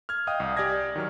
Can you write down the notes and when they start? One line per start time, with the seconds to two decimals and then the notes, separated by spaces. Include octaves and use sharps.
0.09 F6 G#6
0.27 D#5 F5 G5 D#6
0.40 C2
0.56 G4 D5 G#5 G#6 A#6
0.96 D#3 F#3 F6